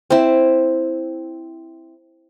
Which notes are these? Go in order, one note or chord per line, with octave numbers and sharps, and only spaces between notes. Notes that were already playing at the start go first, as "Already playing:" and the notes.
C4 E4